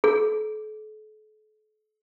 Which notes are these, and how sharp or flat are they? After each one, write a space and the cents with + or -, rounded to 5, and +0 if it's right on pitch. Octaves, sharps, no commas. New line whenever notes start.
A4 -40